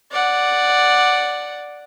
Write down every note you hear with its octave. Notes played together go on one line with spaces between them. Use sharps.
D5 F#5